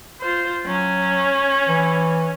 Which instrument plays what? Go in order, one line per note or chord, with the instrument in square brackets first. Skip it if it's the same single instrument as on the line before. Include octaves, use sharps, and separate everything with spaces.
[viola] F4 C5
[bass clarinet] F#3 [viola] C#4
[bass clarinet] E3